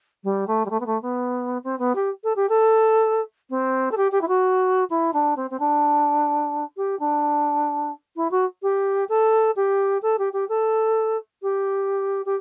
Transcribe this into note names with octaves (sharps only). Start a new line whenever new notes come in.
G3
A3
G3
A3
B3
A3
B3
C4
B3
G4
A4
G4
A4
C4
A4
G4
G4
E4
F#4
E4
D4
C4
C4
D4
G4
D4
E4
F#4
G4
A4
G4
A4
G4
G4
A4
G4
G4